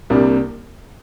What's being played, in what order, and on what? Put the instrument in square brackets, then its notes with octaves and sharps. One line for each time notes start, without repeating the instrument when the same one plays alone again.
[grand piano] C2 C3 G3 A#3 D4